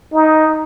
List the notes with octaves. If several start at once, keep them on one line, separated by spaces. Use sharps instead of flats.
D#4